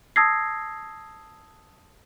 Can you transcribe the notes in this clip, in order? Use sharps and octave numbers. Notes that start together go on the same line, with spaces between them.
A5 D#6 E6 G#6 A#6 C7